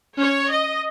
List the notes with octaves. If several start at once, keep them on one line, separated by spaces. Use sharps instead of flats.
C#4 C#5
D#5